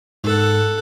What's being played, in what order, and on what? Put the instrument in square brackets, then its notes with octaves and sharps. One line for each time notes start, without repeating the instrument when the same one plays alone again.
[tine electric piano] G#2 [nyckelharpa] A4 F#5